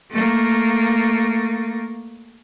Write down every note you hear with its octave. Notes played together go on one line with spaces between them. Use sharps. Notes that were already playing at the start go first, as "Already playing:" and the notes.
A3 A#3